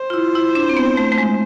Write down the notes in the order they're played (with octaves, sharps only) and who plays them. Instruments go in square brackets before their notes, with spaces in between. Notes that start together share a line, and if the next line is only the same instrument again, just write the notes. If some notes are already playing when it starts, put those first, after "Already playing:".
Already playing: [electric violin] C5
[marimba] F4
E4
E4
D4
C4
B3
A3
A3
G#3